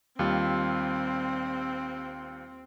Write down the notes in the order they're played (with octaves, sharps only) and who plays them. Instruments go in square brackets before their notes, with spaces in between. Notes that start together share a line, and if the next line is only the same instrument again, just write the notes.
[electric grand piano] D#2 G3 F4 [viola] C4